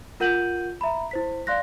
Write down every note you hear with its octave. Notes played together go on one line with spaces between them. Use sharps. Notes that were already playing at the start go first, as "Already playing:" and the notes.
F4 A#4 F#5 G6 D#7 F#7
E5 A#5 B5
E4 C5 B6
D5 F5 C6 F#6 A#6